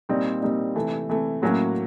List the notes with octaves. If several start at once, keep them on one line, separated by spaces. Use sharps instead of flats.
A#2 G3 C4 D#4
A#2 G3 C4 D#4
C3 E3 A3
C3 E3 A3
A2 F#3 A#3 C#4 F#4